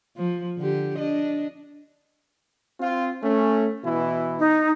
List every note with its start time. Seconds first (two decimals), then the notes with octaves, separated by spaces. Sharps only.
0.16 F3
0.58 D3 G4
0.98 D4 D#5
2.80 C4 F4
3.23 A3 C#4
3.84 B2 E3 E4
4.40 D#4